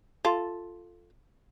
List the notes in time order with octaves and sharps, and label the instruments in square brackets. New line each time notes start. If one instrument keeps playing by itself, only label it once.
[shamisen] F4 A4